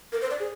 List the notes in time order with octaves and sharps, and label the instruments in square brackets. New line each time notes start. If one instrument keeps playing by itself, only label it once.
[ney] A#4
C5
D5
G#4